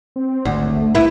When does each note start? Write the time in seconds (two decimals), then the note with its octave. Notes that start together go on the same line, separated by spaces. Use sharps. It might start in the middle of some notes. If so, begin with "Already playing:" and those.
0.16 C4
0.45 G#1 D2
0.76 A3
0.95 C2 E4 B4